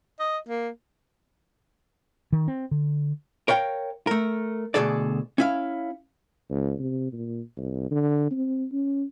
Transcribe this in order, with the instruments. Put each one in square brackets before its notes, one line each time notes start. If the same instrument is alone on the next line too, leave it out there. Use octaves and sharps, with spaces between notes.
[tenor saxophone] D#5
A#3
[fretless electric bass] D#3
C4
D3
[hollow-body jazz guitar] A#4 C#5 F5 G5
A3 A#4
D2 G2 B2 G#4 A4 D5
C#4 E4 F5
[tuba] C#2
C3
A#2
C2
D3
C4
C#4